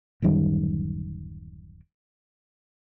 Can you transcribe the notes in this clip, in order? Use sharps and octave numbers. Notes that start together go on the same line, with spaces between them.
D1 F#2 D#3 G3